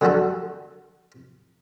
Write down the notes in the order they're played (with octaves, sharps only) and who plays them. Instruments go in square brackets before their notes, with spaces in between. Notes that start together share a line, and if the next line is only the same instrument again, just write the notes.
[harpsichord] D3 F#3 G3 F#4 A4